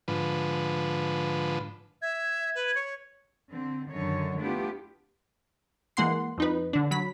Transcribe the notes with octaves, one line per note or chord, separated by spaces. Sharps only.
G#2 D3 F3 B4
E5 G#6
B4
C#5
D3 C4
F#2 D3 D#3 C#5
A3 B3 D4 E4 F4 G4
E3 G#3 A#3 F#5 C6 C7
F2 D#4 B4
D3 D4
F#3 B5 B6